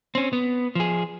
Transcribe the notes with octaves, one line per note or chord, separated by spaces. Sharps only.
C4 C#4
B3
F3 G#4